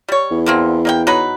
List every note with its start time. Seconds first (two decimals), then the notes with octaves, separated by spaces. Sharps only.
0.08 G3 C#5
0.31 E2
0.46 D3 A#3 C4
0.85 A#3 D#5 G5
1.07 F#3 D#4 B4